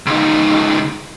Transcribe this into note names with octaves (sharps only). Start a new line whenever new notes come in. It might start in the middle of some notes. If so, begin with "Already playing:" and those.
C#2 D#4